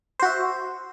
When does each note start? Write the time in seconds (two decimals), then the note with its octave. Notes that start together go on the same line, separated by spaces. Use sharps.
0.19 C5
0.22 F#4
0.25 E5